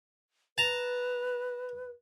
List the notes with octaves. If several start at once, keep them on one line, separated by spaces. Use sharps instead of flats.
B4 A5 A#5